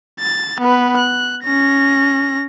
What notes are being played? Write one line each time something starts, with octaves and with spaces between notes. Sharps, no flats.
A6
B3 B4
F#6
C#4 A#6